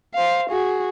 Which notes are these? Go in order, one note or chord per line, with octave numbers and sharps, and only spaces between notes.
C5 F5
F#4 G#4